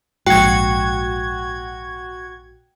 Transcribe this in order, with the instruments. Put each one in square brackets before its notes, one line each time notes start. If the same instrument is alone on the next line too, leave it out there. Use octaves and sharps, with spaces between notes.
[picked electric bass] A#1 G#2 [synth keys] F#4 G#6 [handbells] G5 C#7